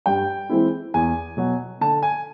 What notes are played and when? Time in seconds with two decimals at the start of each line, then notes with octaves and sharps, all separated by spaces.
0.06 G2 G5
0.49 E3 G#3 C4 E4
0.94 E2 G#5
1.37 B2 F#3
1.81 D3 A5
2.02 G#5